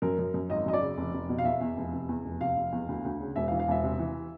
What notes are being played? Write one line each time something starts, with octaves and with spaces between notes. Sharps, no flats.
F#2 A#4
F#2
F#2
G#1 D#5
F#2 D#5
D5
C#3
F1
F1
B2
F5
E2 E5
E2
F1
C3
E2
F1
C3 F5
F1
E2
D2
D2
C#3
E1 E5
F5
E3
F5
E1 E5
C3
E3